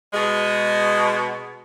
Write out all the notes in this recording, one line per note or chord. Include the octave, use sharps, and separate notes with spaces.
B2 G#3